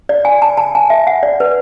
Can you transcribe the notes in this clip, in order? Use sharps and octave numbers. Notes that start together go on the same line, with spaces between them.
D5
G#5
A5
A5
G#5
E5
F#5
D5
B4